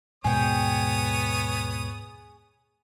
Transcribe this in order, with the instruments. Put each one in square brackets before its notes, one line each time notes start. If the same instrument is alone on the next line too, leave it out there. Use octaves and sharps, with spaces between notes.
[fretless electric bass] D#2 G#2 B2 [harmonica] B3 C#5 D#6 [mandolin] G#4 G5